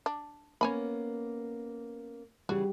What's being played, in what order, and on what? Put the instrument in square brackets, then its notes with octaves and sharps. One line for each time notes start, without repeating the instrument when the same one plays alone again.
[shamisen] D4
[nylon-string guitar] A#3 B3 C#4 [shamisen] C#5 G#5 B5
[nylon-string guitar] C#3 E3 [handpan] G3 G4 [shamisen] F#4